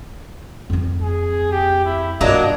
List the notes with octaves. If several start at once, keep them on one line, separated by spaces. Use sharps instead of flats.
F2 C4
G#4
G4
E4
G2 F#3 A#3 D4 F4 D#5